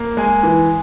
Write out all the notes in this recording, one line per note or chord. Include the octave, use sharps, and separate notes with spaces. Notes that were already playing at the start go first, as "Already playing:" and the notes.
Already playing: A#3
G#3 G#5
E3